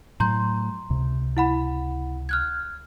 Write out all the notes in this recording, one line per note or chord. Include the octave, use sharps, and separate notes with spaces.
A2 F#3 A#5 C6 G6
C#2 C3
E4 F#5 B5
F6 F#6 G#6